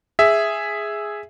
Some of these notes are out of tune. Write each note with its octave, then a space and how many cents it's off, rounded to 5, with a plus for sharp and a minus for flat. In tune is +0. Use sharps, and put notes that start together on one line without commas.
G#4 +0 E5 +0